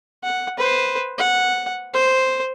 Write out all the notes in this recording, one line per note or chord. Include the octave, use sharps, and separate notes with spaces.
F#5
B4 C5
F#5
C5